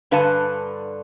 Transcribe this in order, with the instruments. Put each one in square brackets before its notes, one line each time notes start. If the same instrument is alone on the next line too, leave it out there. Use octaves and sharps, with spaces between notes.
[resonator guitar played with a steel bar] G2 D3 B4 F5 G#5 A5